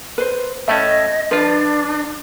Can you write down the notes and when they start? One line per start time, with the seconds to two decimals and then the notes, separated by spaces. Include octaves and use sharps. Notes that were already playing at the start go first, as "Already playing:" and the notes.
0.18 B4 C5
0.68 A2 A3 C#4 D#5 E5
1.31 F3 D4 F4 B4